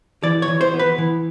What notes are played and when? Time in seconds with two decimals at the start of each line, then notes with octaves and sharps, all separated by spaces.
0.23 E3 D5
0.42 C#5
0.48 E3
0.61 C5
0.74 B3
0.79 B4
0.98 E3